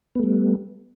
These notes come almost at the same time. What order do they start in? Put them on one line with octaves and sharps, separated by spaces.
B3 A3 G3